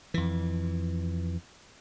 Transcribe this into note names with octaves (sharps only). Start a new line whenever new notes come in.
F2 E3